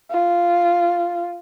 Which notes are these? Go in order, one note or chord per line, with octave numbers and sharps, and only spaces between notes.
F4